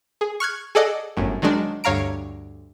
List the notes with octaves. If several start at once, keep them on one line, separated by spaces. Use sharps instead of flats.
G#4
C#6 F6 F#6 G#6
G#4 A4 D5 D#5 F#5
G1 F#2 A2
D#3 F#3 G#3 D4
D2 G2 C#5 F5 A#5 D7